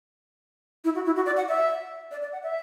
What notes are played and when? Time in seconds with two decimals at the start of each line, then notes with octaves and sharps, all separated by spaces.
0.84 E4
0.95 F#4
1.06 E4
1.16 F#4
1.26 D5
1.37 F#5
1.48 E5
2.11 D5
2.22 D5
2.32 F#5
2.43 E5